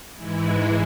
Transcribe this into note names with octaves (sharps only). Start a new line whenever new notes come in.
G#2 E3 G#3 E4